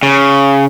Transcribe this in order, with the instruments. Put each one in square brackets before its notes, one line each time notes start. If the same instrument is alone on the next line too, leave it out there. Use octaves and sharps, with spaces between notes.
[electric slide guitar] C#3